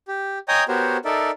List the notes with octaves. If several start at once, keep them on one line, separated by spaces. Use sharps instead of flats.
G4
C#5 D#5 G5 G#5 A#5 D#6
B3 F#4 G4 A#4 C5 C#5
D#4 A4 A#4 D5 E5